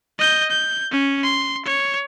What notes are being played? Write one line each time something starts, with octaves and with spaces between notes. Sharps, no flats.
D#5 G6
G6
C#4
C6
C#5